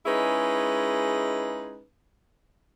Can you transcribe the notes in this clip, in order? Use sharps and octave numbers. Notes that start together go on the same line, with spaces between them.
G#3 C#4 D#4 E4 G#4 B4